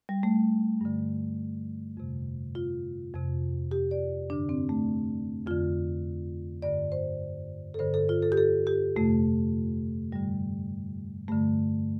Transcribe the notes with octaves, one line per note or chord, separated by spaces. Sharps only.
G3
A3
G2 D3
F2 C3
F4
F2 C3
G4
D5
G2 D3 D4
C4
A3
F2 D3 F4
G2 D3 D5
C5
A4
G2 D3 C5
A4
F4
A4
G4
A4
G4
F2 C3 A3
G2 D3 G3
G2 D3 A3